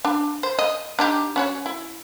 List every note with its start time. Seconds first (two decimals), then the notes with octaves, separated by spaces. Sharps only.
0.05 D4
0.43 C5
0.59 D#5
0.99 D4 D#4 G4
1.36 C#4 F#4 C#5
1.66 E4